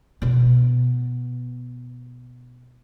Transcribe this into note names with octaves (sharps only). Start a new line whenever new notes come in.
B2 B3